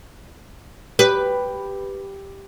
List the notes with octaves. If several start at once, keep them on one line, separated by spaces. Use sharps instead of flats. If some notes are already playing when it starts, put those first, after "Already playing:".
G4 B4